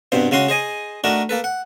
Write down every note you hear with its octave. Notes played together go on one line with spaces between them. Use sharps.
C2 G2 B2 C5
C#3 G#3 C#4 F#4 C6
G#4 C5 D#5 G#5
A3 D4 D#4 F#4 A#4
A#3 A4 B4
F#5